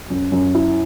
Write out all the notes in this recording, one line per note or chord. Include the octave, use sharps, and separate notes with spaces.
F#2
F#2
E4